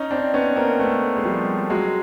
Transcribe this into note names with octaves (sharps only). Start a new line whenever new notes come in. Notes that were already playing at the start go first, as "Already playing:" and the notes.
Already playing: C#4 D#4
C4 D4
B3 C#4
A#3 C4
A3 B3
G#3
F3 G3
F#3 G#3